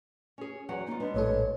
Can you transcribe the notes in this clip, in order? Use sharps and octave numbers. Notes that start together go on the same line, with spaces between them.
C#4 G#4
E2 F#3 F#5
A#3 D#4 F4
G3 G#3 B3 D4
A#1 A2 A4 C#5